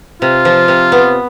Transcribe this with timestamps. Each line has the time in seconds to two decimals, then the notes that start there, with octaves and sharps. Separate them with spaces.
0.22 C3 F4
0.45 F3
0.68 C3
0.92 B3